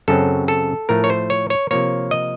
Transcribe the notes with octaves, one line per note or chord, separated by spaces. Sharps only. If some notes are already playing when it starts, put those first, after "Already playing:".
F#2 C#3 F#3 C4 A4
A4
A2 F3 A3 A#4
C#5
C5
C#5
C#5
C3 F3 A#3 C#5
D#5